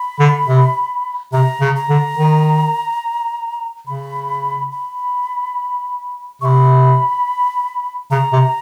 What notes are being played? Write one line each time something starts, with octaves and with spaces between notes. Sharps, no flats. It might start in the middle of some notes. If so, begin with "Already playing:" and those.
Already playing: B5
D3
C3
C3 A#5
C#3
A#5
D3
D#3
C#3 B5
B5
C3 B5 C#6
C#3 A#5
C3